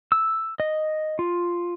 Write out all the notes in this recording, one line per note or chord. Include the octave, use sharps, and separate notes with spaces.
E6
D#5
F4